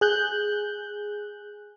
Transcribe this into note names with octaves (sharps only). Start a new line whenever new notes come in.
G#4 F#6 G6